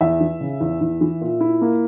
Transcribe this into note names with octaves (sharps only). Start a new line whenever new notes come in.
E2 E5
E3
C#3
E2
E2
E3
A#2
E4
A#3